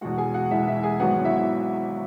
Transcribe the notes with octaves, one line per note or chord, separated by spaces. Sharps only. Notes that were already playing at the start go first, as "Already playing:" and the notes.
E2 B2 G#3 F#4 F#5
G#4 G#5
F#4 F#5
E2 B2 G#3 E4 E5
E4 E5
G#4 G#5
G#1 G#2 F#3 B3 F#4 F#5
E4 E5